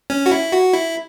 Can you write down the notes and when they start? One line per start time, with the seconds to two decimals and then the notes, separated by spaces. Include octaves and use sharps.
0.10 C#4
0.26 F#4
0.31 E4
0.52 F#4
0.73 E4